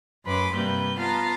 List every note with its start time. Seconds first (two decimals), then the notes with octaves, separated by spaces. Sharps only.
0.25 F#2 B4 B5 C6 D6
0.54 G2 C3 G3 A#3 B4 G6
0.97 B3 F4 F5 A5 A#5